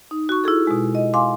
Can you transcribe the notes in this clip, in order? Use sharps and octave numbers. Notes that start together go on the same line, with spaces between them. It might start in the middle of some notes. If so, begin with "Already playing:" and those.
D#4
F#4 C#6
E4 F4 G#4 A4
B2 G#3
D#5
F5 G#5 C6 D6